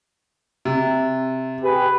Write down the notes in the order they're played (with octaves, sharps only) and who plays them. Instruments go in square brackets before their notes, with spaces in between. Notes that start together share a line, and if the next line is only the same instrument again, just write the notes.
[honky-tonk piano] C3
[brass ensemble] G4 G#4 B4